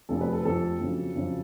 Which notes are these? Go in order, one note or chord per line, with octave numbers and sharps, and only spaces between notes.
F1 F2 F3 A4
B4
A4
F1 F2 F3 A4
F2 C#3 F#3
F2 C#3 F#3